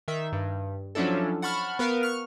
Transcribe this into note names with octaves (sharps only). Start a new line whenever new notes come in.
D#3 E5
G2
F3 F#3 C#4 D4 E4 A4
F#5 A5 B5 C#6 F6
B3 A#4 B4 F5
C#6 F6